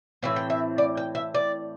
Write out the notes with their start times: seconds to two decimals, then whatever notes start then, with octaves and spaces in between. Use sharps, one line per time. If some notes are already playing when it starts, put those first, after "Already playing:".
0.23 A2 E3 C4 E5
0.36 G5
0.50 E5
0.78 D5
0.97 G5
1.15 E5
1.34 D5